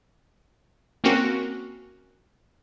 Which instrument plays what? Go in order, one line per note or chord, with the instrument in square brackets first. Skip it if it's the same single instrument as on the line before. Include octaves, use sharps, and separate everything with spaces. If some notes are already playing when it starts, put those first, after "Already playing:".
[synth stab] A#3 C4 C#4 F#4 A#4